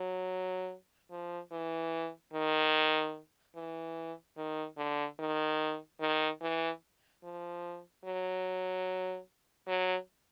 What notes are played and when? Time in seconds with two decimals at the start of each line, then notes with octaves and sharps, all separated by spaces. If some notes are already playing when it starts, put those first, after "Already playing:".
Already playing: F#3
1.11 F3
1.52 E3
2.33 D#3
3.56 E3
4.37 D#3
4.78 D3
5.19 D#3
6.01 D#3
6.42 E3
7.23 F3
8.05 F#3
9.68 F#3